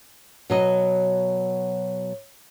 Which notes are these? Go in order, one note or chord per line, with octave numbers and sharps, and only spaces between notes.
B2 F#3 D#5